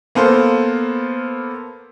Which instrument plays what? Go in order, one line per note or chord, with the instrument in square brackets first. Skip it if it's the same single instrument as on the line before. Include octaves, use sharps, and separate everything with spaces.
[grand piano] A#3 B3 A4 C5